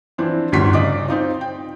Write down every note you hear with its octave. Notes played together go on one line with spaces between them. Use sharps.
E3 F3 C4 D4 E4
G1 D2 A2 G3 C6 B6
C#3 D5 D#5 D6
C4 D#4 F4
G5